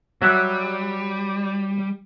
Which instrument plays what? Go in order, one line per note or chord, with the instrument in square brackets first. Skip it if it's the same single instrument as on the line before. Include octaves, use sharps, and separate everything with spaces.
[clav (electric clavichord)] F#3 E5 F#5 [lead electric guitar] G3